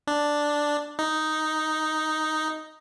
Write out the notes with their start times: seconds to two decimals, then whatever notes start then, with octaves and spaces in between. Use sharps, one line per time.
0.07 D4
0.99 D#4